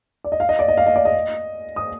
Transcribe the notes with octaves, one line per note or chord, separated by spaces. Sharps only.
D5
D#5
F5
D#5
D5
D#5
F5
D#5
D5
D#5
D#6